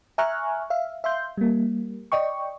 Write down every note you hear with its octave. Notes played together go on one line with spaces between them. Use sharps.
E5 G#5 A#5 C#6 F6 F#6
E5 F5
E5 F5 C6 G6
G3 A#3
D5 D#5 G5 C#6